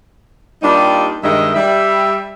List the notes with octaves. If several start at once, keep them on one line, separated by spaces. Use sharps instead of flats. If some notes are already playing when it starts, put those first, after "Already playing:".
G3 A#3 D4 D#4 F4 G4
G2 D#3 G#3 D#5 E5
G3 E5